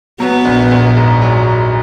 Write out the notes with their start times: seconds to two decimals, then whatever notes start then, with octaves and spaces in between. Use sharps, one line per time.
0.20 F#3 B3
0.45 A#1
0.71 A#1
0.97 G#2
1.22 F#3